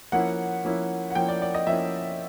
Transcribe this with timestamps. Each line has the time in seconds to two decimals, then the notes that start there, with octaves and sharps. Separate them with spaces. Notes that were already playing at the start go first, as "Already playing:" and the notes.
0.12 F3 A#3 C#4 E4 F#5
0.65 F3 A#3 C#4 E4
1.10 F#5
1.15 F3 A#3 C#4 E4 G5
1.28 D5
1.42 D5
1.55 D#5
1.67 F3 A#3 C#4 E4 E5